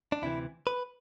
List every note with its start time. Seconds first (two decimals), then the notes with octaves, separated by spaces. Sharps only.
0.12 D4
0.22 D2 C3 E3 E4
0.67 B4